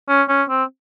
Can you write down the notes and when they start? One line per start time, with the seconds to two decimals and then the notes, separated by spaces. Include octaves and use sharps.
0.09 C#4
0.29 C#4
0.50 C4